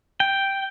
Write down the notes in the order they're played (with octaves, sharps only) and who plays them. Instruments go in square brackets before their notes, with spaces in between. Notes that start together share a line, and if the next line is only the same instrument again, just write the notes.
[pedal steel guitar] G5